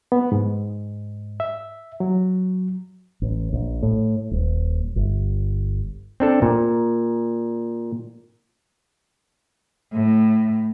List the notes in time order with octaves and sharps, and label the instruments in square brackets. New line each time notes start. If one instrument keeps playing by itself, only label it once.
[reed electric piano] B3
G#2
E5
F#3
[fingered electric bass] A1
A#1
A2
D#1
G1
[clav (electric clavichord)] C4 D4 A4
A#2
[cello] A2